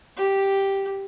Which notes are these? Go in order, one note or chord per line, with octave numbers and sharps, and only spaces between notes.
G4